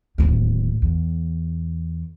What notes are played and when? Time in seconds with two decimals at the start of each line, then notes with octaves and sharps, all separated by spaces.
0.18 D1 D#2
0.82 E2